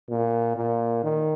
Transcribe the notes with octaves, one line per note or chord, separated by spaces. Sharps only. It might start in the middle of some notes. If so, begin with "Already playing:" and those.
A#2
A#2
D#3